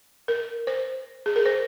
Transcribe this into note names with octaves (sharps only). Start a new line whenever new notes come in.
A#4
C5
G#4
A#4
C5